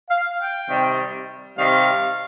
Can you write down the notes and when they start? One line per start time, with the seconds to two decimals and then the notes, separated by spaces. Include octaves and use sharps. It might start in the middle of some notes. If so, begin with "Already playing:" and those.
0.09 F5
0.39 G5
0.68 C3 D#3 G3
1.56 C3 D#3 G3 F5